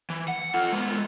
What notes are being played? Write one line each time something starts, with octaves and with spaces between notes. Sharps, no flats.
E3
F#5
F4 A4
G#3 B3